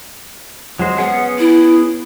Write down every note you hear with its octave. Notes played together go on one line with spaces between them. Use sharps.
F#3 G#3 C5
B3 C#4 G#4 F#5
E4